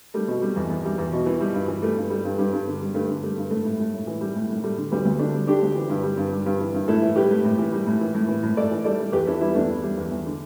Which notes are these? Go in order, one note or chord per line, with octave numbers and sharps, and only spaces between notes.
G3 A3
B2
G3
E2
E2
G3
E2
B2
E3
G3
G2
E3
G3 A3
G2
G3
G2
G2 G3
G2
D3
G3
G2 A3
D3
G3 A3
G2
A2 A3
A2
A2
A2
E3
G3
A2
A2
G3 A3
D3
D2 G3 B3
D2
G3 A3 D4
G3
D3 D4 G4
D2
E3
G2
G3
G2
G3
G2
E3
G2
A2 E4 A4
E3
G3 G4 B4
A2
A2
E3
G3
A2
E3
A2
E3
A2
A2 A4 D5
E3
G3 A4 D5
G3
E2 G4 B4
E2 E4 A4
G3 B3 E4
E2 A3 D4
E2
G3
E2
E2
D3